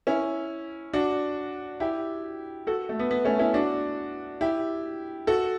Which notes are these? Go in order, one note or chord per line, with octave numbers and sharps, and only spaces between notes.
C#4 E4
D4 F#4
E4 G4
F#4 A4
A3
B3
B3
A3 C#4
C#4 E4
D4 F#4
E4 G4
F#4 A4